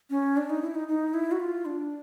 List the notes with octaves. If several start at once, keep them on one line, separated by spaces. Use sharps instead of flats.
C#4
D4
D#4
E4
D#4
D#4
E4
F#4
F4
D4